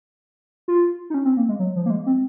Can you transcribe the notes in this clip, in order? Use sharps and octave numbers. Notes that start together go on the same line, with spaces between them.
F4
D#4
C#4
C4
A#3
G#3
F#3
F3
A#3
G#3
C4